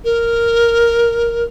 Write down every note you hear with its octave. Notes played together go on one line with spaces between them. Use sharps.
A#4